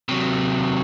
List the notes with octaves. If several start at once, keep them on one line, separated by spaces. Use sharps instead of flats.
C3 F#3